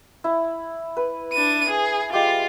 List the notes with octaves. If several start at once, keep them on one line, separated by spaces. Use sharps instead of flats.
E4
B4
D4 D#7
G#4
G#3 F4 G4 F5